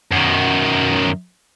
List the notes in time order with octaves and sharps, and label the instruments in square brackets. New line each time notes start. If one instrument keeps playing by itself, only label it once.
[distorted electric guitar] F#2 D#3